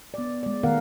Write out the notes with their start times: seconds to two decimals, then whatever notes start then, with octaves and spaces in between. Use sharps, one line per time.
0.14 B3 D5
0.43 G#3 D5
0.63 D#3 A3 B3 A#4 F5 F#5